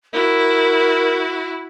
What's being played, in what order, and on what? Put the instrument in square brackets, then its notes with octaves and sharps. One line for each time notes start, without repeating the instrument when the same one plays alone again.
[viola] E4 F#4 [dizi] A#4